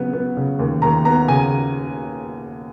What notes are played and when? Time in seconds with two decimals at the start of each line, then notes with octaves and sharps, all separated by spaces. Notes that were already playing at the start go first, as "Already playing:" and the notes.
Already playing: C#3 F#3 B3
0.13 B3
0.37 C#3
0.59 D#2
0.82 D#2 A#5
1.05 B3 A#5
1.28 C#3 G#5